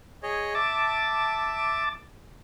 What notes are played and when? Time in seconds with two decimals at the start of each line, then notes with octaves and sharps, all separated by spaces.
0.23 G#4 C#5 D#5
0.55 E5 A5 D6